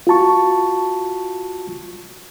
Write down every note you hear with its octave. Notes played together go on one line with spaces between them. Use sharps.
F4 F#4 A5 C#6